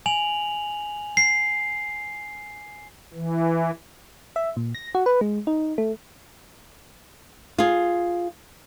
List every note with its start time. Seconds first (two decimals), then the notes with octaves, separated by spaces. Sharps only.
0.06 G#5 F7 F#7
1.17 C7
3.14 E3
4.36 E5
4.57 A#2
4.75 A#6
4.95 F#4
5.06 B4
5.21 G#3
5.47 D#4
5.78 A3
7.58 F4 G#4